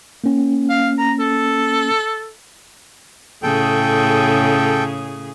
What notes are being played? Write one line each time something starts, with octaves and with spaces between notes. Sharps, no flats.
A#3 C#4
F5
A#5
A4
A2 C#3 G#4 A4 G5